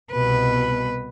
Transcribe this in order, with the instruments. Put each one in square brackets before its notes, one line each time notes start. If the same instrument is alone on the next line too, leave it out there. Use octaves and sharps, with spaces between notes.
[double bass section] C2 B2 [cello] B4